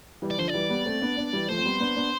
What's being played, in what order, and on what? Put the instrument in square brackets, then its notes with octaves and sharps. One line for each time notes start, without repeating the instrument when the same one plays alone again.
[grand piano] E3 G3
[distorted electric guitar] D5
[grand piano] D3 F3 [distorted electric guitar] C5
[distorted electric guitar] D5
[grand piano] E3 G3
G3 B3
A3 C4
B3 D4
B3 D4
E3 G3
[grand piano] F3 A3 [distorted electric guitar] C5
[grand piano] C4
G3 B3
B3 D4
B3 D4